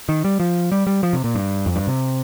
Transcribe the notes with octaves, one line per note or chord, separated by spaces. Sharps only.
D#3
G3
F3
G3
G3
F3
C3
A#2
G2
F2
G2
C3